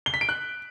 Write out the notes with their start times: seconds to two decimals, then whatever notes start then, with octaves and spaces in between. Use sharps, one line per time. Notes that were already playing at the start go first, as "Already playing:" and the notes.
0.06 G7
0.14 B6
0.21 D7
0.29 F#6